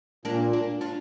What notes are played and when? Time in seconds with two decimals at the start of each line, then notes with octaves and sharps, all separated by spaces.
0.25 A#2 A#3 D4
0.53 A#3 D4
0.81 D4 F4